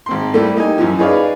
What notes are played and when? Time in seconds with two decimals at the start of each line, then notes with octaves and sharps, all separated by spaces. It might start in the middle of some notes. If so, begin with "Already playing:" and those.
0.06 G#1 C4 C6
0.34 G3 A3 A#3 E4 G4
0.55 A#3 D#4 G4 G#5
0.78 F#2 E3 F3
0.98 D#4 G#4 B4 C#5 D5 F5